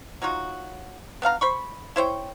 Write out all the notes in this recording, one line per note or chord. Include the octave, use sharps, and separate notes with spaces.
F#3 D#4 F4 F#4
B3 D4 F5 A#5
C5 B5 C#6
E4 C5 C#5 G5